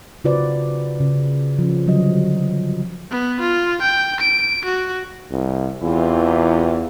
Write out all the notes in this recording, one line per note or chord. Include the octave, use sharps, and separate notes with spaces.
C#3 F4 F#4 B4 C5 D5
C#3
F3 C#4
D3 F#3 G3 D#5
B3
F4
G5
D7
F#4
C2
E2 C3 E3 F4